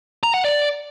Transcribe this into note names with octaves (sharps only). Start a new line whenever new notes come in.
A#5
F#5
D5